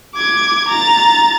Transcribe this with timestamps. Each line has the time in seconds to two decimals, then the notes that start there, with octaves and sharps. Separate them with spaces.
0.14 D6 G#6
0.68 A#5 A6